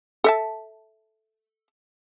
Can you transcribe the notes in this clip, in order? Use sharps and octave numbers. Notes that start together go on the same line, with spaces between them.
A4 E5 A5